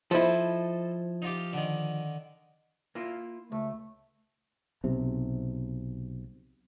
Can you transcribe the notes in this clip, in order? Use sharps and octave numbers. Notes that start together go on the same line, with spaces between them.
F3 E4 A4 C5 D#5
D#4 F4 G4
D3 D#3
A#3 E4 F4
C#2 A3
B1 C3